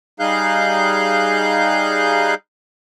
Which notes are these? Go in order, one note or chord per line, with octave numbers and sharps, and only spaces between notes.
G3 D#4 G#4 F5 F#6 G6